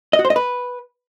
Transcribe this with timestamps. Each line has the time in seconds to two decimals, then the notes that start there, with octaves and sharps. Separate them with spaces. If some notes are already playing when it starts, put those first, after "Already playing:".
0.13 D#5
0.19 F#4
0.25 C5
0.30 D#5
0.36 B4